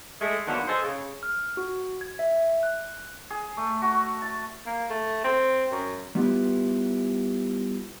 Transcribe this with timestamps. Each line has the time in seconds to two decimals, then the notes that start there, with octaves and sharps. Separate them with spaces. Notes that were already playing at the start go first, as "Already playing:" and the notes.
0.19 G#3 A3
0.47 D3 D#3 F#3 A#3 B3
0.68 G#4 A4 C5 D#5
0.83 C#3
1.23 F6
1.57 F#4
2.01 G#6
2.19 E5
2.63 F#6
3.30 G#4
3.57 A3
3.82 F#4
4.22 A5
4.67 A#3
4.90 A3
5.24 C4
5.72 F#2
6.15 G3 B3 E4 F4 G4 B4